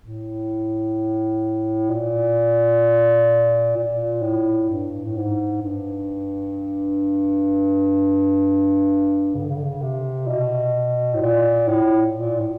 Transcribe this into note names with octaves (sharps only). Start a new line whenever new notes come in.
A2
A#2
A#2
A2
G2
A2
G#2
G2
C#3
D3
C#3
D3
C#3
C3
B2
A2
A#2
A2
A#2
A2